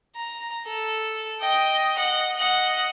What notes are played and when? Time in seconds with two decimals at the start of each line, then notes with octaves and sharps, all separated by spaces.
0.16 A#5
0.66 A4
1.40 D#5 G5
1.96 D#5 F#5
2.34 D#5 F#5